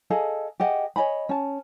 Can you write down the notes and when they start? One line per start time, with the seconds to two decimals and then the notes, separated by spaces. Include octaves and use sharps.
0.10 G#4 A4 D#5 F5
0.60 G4 G#4 D#5 F#5
0.96 C#5 D#5 G#5 B5
1.29 C#4 A5